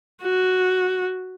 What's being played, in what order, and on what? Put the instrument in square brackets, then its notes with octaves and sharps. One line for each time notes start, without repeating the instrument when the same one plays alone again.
[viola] F#4